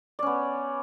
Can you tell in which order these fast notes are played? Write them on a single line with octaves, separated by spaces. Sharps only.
D5 C#4 B3